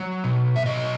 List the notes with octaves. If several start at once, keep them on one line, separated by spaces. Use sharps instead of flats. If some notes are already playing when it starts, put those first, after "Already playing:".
Already playing: F#3
B2
E5
F#3 D#5